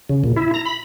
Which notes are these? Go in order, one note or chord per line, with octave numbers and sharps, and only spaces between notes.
C#3
A#2
E4
A#5
B5